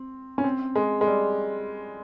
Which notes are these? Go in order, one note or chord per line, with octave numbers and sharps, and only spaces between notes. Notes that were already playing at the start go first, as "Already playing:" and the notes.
Already playing: C4
C#4
C4
G#3
G#3
G3